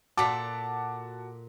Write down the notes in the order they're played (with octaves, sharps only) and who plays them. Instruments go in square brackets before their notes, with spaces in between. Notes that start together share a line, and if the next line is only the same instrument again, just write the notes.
[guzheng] A#2 A4 [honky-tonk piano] F#4 [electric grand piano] A5 [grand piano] D6 B6